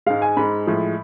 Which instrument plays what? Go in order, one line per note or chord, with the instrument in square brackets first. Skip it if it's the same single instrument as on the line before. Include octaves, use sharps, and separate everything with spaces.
[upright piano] G#2 G#3 F5
G#5
G#2 G#3 B5
A2 F3 G#3